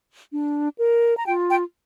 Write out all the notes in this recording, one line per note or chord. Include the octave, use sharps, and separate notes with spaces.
D4
A#4
A#5
F4 G5
G5